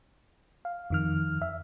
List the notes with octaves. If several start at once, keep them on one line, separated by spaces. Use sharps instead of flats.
F5
F2 D#3 F6
E5